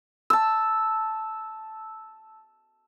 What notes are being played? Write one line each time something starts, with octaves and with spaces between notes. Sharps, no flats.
A5 E6